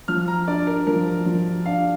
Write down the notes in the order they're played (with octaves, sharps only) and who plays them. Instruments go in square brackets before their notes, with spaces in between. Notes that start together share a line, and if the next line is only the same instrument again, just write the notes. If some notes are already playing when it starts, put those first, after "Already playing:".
[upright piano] F3 [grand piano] F6
[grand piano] A#5
[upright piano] D4 [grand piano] D5
[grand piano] A#4
[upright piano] F3 [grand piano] A#4
[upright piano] F3
[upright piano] D4 [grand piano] F5